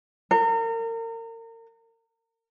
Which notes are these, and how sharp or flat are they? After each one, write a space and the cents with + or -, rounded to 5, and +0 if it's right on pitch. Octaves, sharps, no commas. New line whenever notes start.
A#4 -35